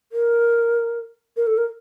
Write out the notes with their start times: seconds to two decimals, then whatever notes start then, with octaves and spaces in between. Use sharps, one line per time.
0.12 A#4
1.37 A#4
1.47 A4
1.57 A#4